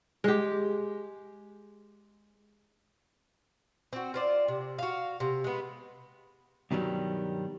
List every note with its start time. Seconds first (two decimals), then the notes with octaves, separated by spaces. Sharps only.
0.24 G#3 G4
3.93 C4 F#4
4.14 F4 C5 D5
4.48 C3
4.79 F#4 F5
5.20 C3
5.44 G#3 B3
6.71 G2 B2 D#3 F#3 G3